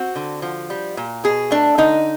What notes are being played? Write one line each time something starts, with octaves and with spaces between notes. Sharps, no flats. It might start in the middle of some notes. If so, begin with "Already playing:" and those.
Already playing: C4 F#4
D3
F3
G3
A#2
B2 G#4
A3 D4
D3 D#4